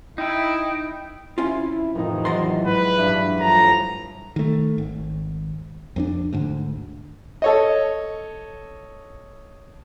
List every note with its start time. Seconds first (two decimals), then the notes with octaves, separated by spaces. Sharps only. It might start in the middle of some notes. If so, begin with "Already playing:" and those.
0.18 D#4 E4 G5
1.38 C2 C#4 E4 F4
1.95 F2 A2 C3 D#3 E3 D#4
2.25 E2 F#3 D#5 C6 A6
2.65 G#2 B4
2.98 G2 D4 E5
3.40 A2 E3 F3 A4 A#5
4.36 D#3 A3
4.78 G#1
5.96 F2 A#3 D4
6.33 D2 G#2 D3
7.42 A4 C#5 D#5